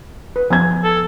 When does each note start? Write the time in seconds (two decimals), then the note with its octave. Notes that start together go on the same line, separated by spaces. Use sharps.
0.36 B4
0.50 F3 B3 G#5 G#6
0.84 A4